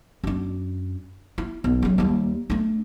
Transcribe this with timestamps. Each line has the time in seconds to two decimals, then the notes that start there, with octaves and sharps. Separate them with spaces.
0.24 F#2 D4
1.38 E4
1.64 B1
1.82 C#3 F#3
1.98 D#2 G3
2.50 A3 D4